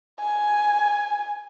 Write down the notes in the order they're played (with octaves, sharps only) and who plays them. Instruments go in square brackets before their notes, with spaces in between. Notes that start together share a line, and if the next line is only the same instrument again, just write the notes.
[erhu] G#5